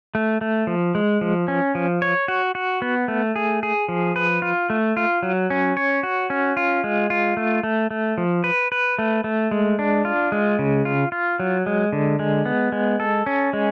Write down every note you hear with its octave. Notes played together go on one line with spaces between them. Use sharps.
A3
A3
F3
G#3
F3
C#4
F3
C#5
F#4
F#4
B3
A3
G#4
G#4
F3
B4
F4
A3
F4
F#3
C#4
C#5
F#4
C#4
F4
G#3
F4
A3
A3
A3
F3
B4
B4
A3
A3
G#3
D4
F4
G#3
C#3
F4
F4
F#3
G#3
D3
G#3
B3
G#3
A4
C#4
G#3